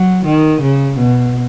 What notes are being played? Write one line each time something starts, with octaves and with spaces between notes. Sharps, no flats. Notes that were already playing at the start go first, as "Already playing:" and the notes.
Already playing: F#3
D#3
C#3
B2